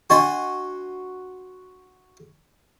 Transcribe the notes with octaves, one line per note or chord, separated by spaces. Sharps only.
D4 F#4 D#5 G#5 C6 C#6